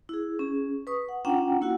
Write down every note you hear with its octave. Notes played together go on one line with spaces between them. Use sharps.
E4 G#4
C#4 G#4
B4 C#6 D#6
F#5
C#4 D4 F4 F#5 G5 A#5
A#3 E4 F#4 F#5